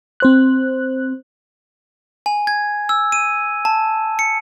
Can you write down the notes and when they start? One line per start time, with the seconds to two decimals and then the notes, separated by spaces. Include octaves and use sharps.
0.20 C4 C5 F#6
2.26 G#5
2.47 G#6
2.89 E6
3.12 D#7
3.65 A5
4.19 C#7